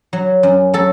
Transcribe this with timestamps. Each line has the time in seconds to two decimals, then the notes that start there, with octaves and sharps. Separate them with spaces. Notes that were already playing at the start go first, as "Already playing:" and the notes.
0.13 F#3
0.43 F#2
0.74 F#3 A4